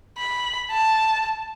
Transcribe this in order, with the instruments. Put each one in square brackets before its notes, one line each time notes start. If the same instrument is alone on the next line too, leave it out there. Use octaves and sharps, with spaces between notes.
[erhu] B5
A5